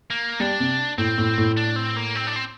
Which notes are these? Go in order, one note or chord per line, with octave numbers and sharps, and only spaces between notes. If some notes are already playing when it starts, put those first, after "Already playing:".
A#3
G3 D4
C3
A2 C4
A2
A2
D4
C4
A#3
C4
D4
C4